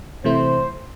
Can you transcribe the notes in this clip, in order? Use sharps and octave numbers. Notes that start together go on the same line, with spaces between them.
C3 E3 A3 E4 C5